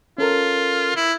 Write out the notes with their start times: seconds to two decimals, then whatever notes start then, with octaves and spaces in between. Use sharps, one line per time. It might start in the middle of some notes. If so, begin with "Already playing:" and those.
0.18 C#4 F4 A4 A#4
0.96 E4